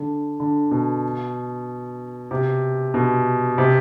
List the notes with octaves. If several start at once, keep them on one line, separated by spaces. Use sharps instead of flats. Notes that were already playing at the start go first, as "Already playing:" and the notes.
Already playing: D3
D3
B2
C3
B2
C3